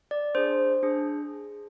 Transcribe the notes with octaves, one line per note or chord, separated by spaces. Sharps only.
D5
D4 G#4 C5
D4 G#4